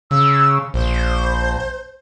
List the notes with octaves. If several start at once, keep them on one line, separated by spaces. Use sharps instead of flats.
C#3 E6
A#1 C5